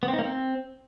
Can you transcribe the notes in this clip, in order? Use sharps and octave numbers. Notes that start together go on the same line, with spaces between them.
B3
C4
D#4
A#3
C4